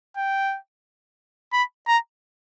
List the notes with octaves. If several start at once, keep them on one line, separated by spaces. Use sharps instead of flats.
G5
B5
A#5